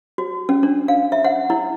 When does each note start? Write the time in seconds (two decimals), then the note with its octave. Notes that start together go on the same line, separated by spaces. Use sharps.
0.18 F#4
0.49 C#4
0.63 D4
0.88 F5
1.12 E5
1.24 F#5
1.50 E4